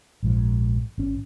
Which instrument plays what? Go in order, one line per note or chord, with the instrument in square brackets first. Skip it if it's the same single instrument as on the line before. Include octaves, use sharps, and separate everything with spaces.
[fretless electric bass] A#1 G#2 F3
G#1 C#4